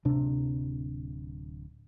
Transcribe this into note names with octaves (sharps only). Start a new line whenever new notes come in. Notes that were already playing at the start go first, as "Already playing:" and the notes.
D1 C3 D4